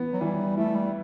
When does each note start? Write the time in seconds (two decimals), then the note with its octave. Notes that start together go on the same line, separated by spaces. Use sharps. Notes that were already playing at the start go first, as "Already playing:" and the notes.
Already playing: E3 B3
0.13 F#3
0.20 E3 G3
0.57 A3 E4
0.75 G3